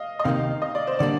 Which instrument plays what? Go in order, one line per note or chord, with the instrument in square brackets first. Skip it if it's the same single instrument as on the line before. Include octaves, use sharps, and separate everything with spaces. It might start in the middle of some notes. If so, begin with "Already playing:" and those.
Already playing: [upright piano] D#5 F5
D#5
[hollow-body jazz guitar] C3 D#3 A#3 D#4 [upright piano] F5
[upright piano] D#5
D5
C5
[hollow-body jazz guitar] D3 G3 A#3 D4 [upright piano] D5